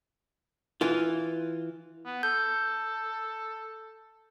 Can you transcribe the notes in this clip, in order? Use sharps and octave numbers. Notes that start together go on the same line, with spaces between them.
E3 F4
B3
A4 G6